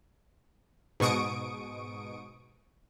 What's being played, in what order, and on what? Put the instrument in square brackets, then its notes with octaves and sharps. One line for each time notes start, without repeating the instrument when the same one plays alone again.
[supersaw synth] G#2 B2 C#6 D#6 D7